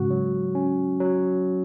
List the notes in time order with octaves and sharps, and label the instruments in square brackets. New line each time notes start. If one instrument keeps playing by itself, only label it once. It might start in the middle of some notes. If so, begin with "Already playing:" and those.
Already playing: [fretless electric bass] G#2 C#3 [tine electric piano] F#4
[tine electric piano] F#3
C#4
F#3